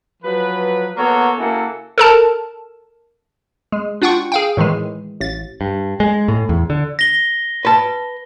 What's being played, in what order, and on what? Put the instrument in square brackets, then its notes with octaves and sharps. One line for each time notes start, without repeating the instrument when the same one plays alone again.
[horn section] F3 F#3 B4
A#3 B3 F#4 A4 C#5
C#3 A#3 E4 F#4 A4
[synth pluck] A4 A#4 A5
[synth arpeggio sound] G#3
D4 F4 F#5 G5 C#6
G#4 F5 G5
A2 D#3 E3 G#3
A1 A6
[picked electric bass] G2
G#3
A2
E2
D3
[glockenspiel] A#6 G7
[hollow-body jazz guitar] B4 A5